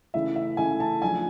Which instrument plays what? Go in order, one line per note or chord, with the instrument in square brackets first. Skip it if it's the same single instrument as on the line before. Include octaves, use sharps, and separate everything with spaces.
[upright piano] C#3 E3 A3 E5
E5
C#3 E3 A3 G#5
A5
F3 A3 D4 G#5